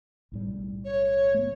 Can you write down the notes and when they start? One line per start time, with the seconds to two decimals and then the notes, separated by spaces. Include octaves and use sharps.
0.32 B1 A2 G3
0.85 C#5
1.34 A3 B3